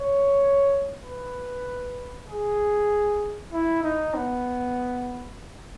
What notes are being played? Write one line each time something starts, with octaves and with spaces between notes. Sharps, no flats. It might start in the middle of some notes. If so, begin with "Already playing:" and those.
Already playing: C#5
B4
G#4
E4
D#4
B3